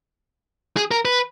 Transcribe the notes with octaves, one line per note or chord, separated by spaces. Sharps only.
G#4
A#4
B4